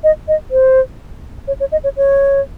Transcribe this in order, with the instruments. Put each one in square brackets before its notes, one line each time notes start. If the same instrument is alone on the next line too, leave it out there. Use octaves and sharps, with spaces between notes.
[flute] D#5
D#5
C5
C#5
C#5
D#5
C#5
C#5